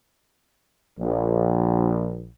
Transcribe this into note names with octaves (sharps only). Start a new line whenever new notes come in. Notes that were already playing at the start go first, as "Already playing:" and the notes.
A#1